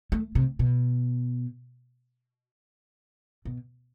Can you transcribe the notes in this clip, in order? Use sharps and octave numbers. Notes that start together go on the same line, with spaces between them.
A3
C3
B2
B2